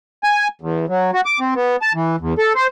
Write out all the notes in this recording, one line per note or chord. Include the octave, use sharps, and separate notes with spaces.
G#5
E2
F#3
F#4
D6
C4
B3
A5
E3
E2
A4
C5